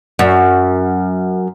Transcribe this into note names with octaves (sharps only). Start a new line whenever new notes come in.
F#2